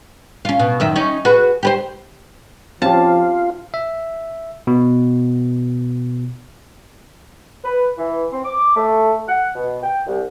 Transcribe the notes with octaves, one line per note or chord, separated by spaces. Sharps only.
C#4 F4
B2
F#2 D#3 E5
C#4 D#4
F#4 G#4 B4
G4 B4 C5
F3 C4 C#4 F4 G4 A5
E5
B2
B4
E3
C4
D6
A3
F#5
B2
G5
C2